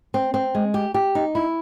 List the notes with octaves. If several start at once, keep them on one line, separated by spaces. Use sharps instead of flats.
C4
C4
G#3
G4
G4
D#4
E4